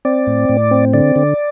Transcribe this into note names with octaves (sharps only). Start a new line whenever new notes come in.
C4 D5
A2
A2
C4
D3 D5
D3